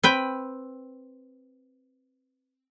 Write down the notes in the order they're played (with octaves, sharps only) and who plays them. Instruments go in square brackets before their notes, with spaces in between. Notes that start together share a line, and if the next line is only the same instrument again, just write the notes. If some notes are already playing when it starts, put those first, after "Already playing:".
[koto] C4 B4 G5